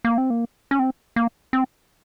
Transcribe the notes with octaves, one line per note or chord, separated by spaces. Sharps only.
A#3
C4
A#3
C#4
C4
A#3
C4